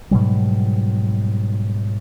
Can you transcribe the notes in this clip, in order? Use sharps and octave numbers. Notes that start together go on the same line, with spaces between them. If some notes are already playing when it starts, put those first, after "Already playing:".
G#2 B2 F#3 G3